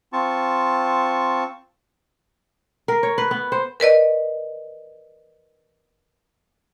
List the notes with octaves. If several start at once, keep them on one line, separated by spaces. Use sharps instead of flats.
C4 F4 A5 C#6
A#4
C#5
B4
B3
C5
A#4 B4 D5 D#5